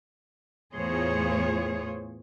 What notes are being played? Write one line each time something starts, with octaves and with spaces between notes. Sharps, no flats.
E2 A2 F4 G#4 C5 C#5